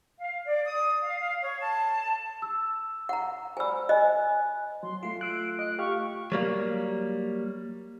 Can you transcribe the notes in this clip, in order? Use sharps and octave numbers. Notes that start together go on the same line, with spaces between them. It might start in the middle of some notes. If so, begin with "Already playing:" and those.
F5
D5
D#6
F5
F5
C#5
A5
E6
F#5 A#5
C5 D5 G#5 B5 E6
D#5 G#5 F#6
F#3 C6
A3 F4 C7
E6 F#6 D7
D#5 F#6
G4 F5 C#6 F6
F#3 G3 A#3